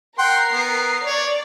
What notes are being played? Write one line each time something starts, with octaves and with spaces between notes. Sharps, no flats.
A#4 F#5 G5 C6 C7
B3
C#5 D5